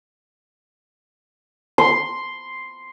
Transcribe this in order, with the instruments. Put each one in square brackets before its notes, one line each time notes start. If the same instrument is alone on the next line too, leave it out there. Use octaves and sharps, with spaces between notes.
[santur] C6